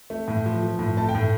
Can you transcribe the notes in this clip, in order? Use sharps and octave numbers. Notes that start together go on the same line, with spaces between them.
A3
A2
F3
F3
A2
A3 A5
G5
A2